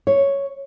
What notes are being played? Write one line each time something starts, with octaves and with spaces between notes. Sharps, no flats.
C#5